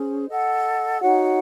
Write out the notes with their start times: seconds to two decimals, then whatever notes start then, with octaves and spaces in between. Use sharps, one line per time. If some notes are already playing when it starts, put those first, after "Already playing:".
Already playing: C#4 G#4 C5
0.29 A4 D#5 F#5
1.00 D#4 F#4 C#5 F#5